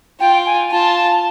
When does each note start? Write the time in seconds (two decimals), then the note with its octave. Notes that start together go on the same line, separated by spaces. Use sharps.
0.20 F4 G5
0.46 G#5
0.71 F4 A5